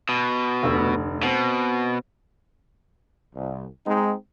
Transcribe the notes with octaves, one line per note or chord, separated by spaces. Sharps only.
B2
F1 D2 E6
B2 C4
C2
G#3 C4 D#4